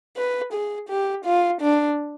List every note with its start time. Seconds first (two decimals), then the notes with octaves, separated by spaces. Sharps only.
0.17 B4
0.53 G#4
0.89 G4
1.25 F4
1.61 D4